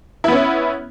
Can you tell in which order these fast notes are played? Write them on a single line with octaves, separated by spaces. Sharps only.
E4 B3 C#4